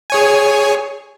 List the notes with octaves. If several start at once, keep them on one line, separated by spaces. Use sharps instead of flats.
G#4 C#5 G#5